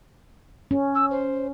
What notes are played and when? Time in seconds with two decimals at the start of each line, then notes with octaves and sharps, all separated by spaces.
0.71 C#4
0.95 E6
1.10 C5